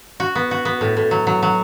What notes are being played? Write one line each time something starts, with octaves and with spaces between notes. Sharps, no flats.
F#4
B3
F#4
B3
A2
A2
F#3
F#3
F#3